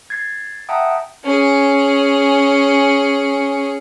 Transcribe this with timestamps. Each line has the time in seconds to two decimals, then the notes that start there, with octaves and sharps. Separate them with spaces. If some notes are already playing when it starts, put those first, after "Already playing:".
0.10 G#6 A6 C7
0.69 E5 F#5 G5 A5 A#5 D#6
1.24 C#4 G#4